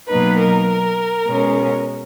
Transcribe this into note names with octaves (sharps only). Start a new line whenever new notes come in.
B2 F#3 A#3 D#4 B4
A#4
B2 G#3 C#4